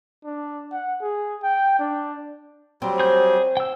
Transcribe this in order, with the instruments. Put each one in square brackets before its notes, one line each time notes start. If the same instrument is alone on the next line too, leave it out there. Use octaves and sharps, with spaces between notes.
[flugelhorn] D4
F#5
G#4
G5
D4
[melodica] F#3 G3 [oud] C4
[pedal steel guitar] G#4 G6
G5 E6